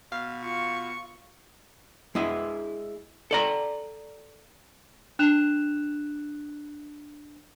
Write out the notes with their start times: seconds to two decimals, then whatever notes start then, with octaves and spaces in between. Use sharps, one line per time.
0.12 B2 F5
0.43 F4 C#6
2.15 G#3 E4 D#5 E5
3.31 A4 D5 A#5
5.19 D4 F#6 E7 F7